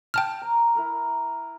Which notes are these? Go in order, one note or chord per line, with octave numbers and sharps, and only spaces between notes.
G5 A5 F6
A#5
E4 A#4 B4